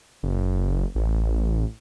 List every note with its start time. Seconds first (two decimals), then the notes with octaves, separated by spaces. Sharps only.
0.23 F#1
0.95 A1